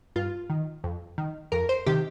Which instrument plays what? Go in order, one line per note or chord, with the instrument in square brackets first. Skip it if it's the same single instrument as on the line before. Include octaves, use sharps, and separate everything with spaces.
[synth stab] G2 F4
D#3
F2
D#3
F2 A#4
C5
C3 D#3 G4